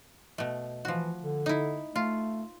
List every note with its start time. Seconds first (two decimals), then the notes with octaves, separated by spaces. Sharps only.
0.38 B2 A3
0.85 E3 F3 F#4
1.20 D3
1.46 D#4 E4
1.96 A3 F4